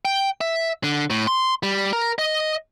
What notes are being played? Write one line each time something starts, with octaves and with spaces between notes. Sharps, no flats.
G5
E5
D3
A2
C6
G3
A#4
D#5